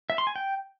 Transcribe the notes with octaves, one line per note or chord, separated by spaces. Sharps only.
E5
C6
G#5
G5